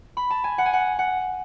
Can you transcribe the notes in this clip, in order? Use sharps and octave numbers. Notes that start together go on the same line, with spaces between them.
B5
A5
G#5
F#5
G#5
F#5
F#5